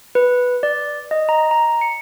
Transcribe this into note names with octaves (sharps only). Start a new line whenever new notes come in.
B4
D5
D#5
A#5
A#5
C#7